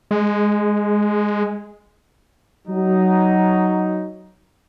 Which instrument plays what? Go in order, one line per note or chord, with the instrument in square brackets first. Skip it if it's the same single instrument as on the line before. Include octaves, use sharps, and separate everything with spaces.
[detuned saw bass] G#3
[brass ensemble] F#3 D#4